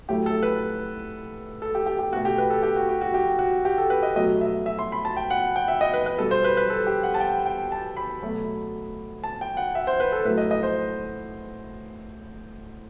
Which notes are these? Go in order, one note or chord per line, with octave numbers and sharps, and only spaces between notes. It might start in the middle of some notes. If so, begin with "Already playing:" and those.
A2 F#3 A3 G4
A4
B4
A4
G4
G4
G4
B2 A3 F#4
G4
B4
A4
G4
F#4
G4
F#4
G4
F#4
G4
A4
B4
D#5
B2 F#3 A3 D#5
E5
E5
C6
B5
A5
G5
F#5
G5
E5
D#5
B4
B4
B2 G3 A4
C5
B4
B4
A4
G4
F#5
A5
G5
G5
A5
B5
B2 F#3 A3
A5
G5
F#5
E5
C5
B4
A4
A2 F#3 A3 B4
D#5
D#5
C5